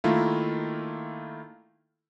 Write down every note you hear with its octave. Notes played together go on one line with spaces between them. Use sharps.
D#3 A3 A#3 E4 F4